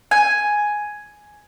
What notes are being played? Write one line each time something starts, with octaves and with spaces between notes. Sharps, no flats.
G#5